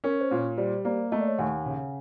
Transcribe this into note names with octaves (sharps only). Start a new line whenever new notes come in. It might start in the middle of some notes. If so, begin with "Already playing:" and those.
C#4 A#4
C5
A#2
C#5
G3 C5 D5
A#3 C5 D5
A3 D#5
D5
C#5 D#5
D#2 F#5 G#5
C#3